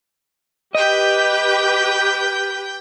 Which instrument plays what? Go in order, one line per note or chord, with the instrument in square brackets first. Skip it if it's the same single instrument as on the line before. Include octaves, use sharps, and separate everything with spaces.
[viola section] G4 B4 [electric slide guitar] D#5 [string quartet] G5 G6